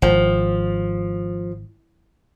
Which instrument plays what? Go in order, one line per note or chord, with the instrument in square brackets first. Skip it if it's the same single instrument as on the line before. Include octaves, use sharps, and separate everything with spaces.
[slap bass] G#1 [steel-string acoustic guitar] F3